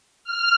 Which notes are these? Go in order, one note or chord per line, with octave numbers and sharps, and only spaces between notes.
F6